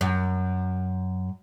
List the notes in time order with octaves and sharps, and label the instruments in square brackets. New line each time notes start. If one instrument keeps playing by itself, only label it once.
[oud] F#2